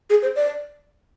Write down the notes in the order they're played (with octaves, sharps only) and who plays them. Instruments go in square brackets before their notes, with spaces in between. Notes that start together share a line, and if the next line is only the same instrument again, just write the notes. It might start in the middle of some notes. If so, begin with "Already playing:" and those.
[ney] G#4
C5
D5